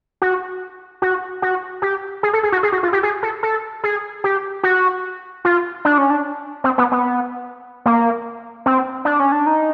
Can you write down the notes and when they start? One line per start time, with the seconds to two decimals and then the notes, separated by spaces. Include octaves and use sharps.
0.22 F#4
1.02 F#4
1.42 F#4
1.82 G4
2.23 G#4
2.33 A4
2.43 G#4
2.52 F#4
2.63 G#4
2.72 F#4
2.83 F4
2.93 G4
3.03 G#4
3.23 A4
3.43 A4
3.84 G#4
4.24 G4
4.63 F#4
5.45 F4
5.85 D4
5.98 C#4
6.10 D4
6.64 C4
6.78 B3
6.92 B3
7.86 A#3
8.66 C4
9.05 D4
9.20 C#4
9.32 D4
9.46 D#4